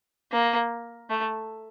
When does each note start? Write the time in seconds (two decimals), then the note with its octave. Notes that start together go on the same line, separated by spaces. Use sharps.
0.32 A#3
1.10 A3